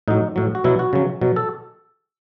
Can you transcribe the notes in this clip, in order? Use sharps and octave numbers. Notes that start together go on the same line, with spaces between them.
A2 F#3 D#4
A2 F#3
F#4
B2 F#3 E4
F#4
C#3 F#3
B2 F#3
A4